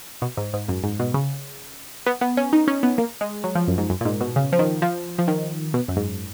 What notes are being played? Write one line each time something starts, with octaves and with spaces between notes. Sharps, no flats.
B2
G#2
G#2
F#2
G#2
B2
C#3
B3
B3
C#4
D#4
C#4
B3
A#3
G#3
F#3
F3
F#2
G#2
F#2
A#2
G#2
B2
C#3
F3
D#3
F3
F3
D#3
B2
F#2
G#2